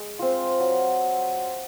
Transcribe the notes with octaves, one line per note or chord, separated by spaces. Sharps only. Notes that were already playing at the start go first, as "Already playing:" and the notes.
Already playing: G#3
C4 F4
F#3